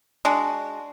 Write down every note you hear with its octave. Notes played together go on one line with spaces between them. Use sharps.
G#3 D4 F#4